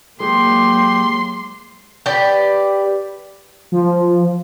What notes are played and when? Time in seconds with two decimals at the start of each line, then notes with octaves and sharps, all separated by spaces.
0.20 F#3 G#3 A#3 G4 C6
2.06 G4 B4 D5
3.72 F3